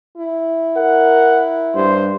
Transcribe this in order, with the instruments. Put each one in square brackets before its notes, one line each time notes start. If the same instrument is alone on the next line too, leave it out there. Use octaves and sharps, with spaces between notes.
[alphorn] E4
[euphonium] A#4 [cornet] F#5
[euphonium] G2 [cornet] C5